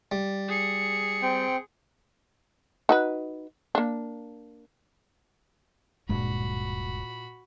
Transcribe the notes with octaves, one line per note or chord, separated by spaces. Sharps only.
G3
G#4 C#7
C4 G5
D#4 F#4 B4
A#3 D4
D1 G2 A#2 G#3 F#4 B5